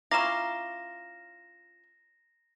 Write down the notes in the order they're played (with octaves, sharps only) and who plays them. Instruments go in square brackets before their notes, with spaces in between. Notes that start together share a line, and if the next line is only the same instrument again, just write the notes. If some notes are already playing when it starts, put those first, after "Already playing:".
[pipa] C#4 E4 F4 [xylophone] A#5 D6 [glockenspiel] A#6 E7